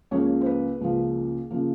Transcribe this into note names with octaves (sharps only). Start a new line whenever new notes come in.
C#2 C#3 F3 A#3 C#5
C5
B4
C#2 C#3 F3 A#3
C#3 F3 A#3